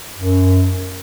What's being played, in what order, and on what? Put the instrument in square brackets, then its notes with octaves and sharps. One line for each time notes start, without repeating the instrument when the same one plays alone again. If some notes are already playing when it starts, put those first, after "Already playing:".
[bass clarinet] F#2